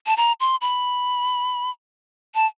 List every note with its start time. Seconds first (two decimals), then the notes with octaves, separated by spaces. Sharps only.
0.07 A5
0.17 A#5
0.40 C6
0.61 B5
2.35 A5